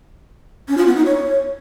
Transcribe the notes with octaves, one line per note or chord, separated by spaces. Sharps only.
C#4
F4
B3
D#4
C#5